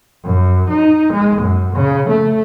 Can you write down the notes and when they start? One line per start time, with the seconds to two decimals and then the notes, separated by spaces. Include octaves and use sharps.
0.24 F#2
0.70 D#4
1.13 G#3
1.42 F#2
1.74 C#3
2.10 A3